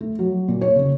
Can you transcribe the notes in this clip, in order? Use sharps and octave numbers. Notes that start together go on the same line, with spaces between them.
A3
F#3
A#2
C#5
C#3